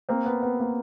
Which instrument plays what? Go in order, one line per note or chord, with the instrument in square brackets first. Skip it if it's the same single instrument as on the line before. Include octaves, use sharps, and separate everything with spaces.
[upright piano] A#3 C4
B3
B3
A#3